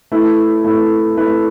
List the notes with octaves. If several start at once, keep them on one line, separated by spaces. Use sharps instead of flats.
A3 E4 B4
A3 E4 B4
A3 E4 B4